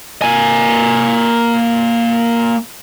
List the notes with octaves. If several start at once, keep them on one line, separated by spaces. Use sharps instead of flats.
A#3 G#5